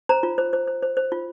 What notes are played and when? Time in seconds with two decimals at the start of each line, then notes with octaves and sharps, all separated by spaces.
0.09 C5 A#5
0.23 F4
0.38 C5
0.53 C5
0.67 C5
0.83 C5
0.97 C5
1.12 F4